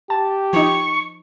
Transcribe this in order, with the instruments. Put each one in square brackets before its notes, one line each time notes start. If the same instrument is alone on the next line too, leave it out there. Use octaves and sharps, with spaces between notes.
[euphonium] G4 [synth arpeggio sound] A5
[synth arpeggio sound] F3 D#4 [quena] C#6